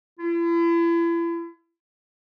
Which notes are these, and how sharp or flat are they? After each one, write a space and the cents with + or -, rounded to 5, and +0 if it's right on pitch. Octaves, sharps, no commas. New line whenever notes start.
E4 +40